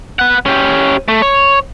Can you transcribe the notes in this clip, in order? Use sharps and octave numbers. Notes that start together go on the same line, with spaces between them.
B3 F#5
C#4 G4
A3
C#5